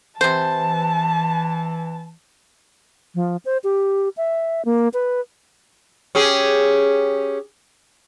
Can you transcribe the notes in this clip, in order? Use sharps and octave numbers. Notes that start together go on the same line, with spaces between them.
C3 E3 C5 A5
F3
C5
G4
E5
A#3
B4
C#4 G4 G#4